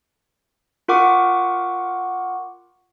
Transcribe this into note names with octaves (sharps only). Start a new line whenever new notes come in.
F4 A#4 F#5 C#6 D6